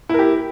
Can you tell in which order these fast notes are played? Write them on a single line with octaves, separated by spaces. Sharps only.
E4 A#4 G4